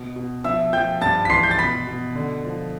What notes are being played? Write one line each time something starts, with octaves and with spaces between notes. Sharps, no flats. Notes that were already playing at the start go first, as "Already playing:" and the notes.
Already playing: B2
B2
F3 E5 E6
F3 G5 G6
G2 A5 A6
B6
E3 C6 C7
G6
A6
B2 B5 B6
B2
D3
F3